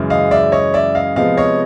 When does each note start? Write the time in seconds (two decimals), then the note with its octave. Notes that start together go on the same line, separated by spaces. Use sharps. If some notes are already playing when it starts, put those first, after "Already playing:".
Already playing: F#2 C#3 E3 G#3
0.10 D#5 F5
0.31 D5 E5
0.52 C#5 D#5
0.74 D5 E5
0.95 D#5 F5
1.16 C3 F3 G#3 B3 D#5 F5
1.37 C#5 D#5